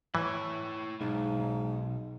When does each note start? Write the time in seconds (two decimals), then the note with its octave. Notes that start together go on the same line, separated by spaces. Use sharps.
0.15 E3 E4 C#5
1.01 B1 G#2